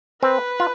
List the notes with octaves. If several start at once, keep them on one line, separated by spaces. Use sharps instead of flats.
C4 B4
F4